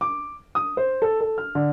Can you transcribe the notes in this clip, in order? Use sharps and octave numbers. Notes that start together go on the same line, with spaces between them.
D6
D#6
C5
A4
A4
F6
D3